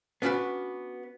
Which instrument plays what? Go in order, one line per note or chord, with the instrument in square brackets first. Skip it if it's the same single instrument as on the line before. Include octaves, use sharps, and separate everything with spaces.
[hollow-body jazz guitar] B3 C#4 D4 F4 F#4 B4